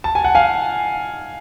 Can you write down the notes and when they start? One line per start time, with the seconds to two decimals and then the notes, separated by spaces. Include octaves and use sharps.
0.04 A5
0.15 G#5
0.24 F#5
0.35 F5 G#5